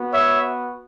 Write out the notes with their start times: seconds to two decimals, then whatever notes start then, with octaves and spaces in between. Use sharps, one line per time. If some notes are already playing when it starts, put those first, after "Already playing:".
Already playing: B3 F#4
0.13 C#5 E5